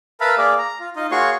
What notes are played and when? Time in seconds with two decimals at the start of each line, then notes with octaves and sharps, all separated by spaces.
0.21 A#4 B4 E5 F5 A5 B5
0.38 A#3 G#4 D5 F5
0.59 A#5
0.80 F4
0.96 D#4 F4 D#5
1.11 A#3 F#4 G#4 C#5 C6 C#6